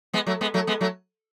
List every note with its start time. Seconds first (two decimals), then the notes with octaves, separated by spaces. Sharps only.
0.13 G#3 B3
0.27 F#3 A3
0.41 G#3 B3
0.54 F#3 A3
0.67 G#3 B3
0.81 F#3 A3